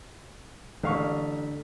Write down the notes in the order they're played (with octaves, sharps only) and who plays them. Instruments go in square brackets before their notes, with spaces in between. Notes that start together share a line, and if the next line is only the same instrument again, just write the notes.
[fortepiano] A1 F5 C#6 [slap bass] D3